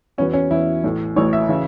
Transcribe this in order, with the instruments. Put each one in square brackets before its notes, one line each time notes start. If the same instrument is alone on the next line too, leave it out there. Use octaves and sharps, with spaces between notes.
[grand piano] E2 E3 B3 F#4 [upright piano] C#4
[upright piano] C#4
[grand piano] E2 E3 B3 F#4 [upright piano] E4
[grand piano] A1 A2 E3
[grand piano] A1 A2 E3 [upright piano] C#5
[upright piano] E5
[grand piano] C#3 E3